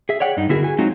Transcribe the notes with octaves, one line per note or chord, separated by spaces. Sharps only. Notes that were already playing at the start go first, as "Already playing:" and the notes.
G#4 E5
C#5 D5 F#5 G5
G2 D#4
D3 B3 E4 F#4 G#4 A#4
F#4 G#5
F#3 G#3 C4 D#4 F4 F#4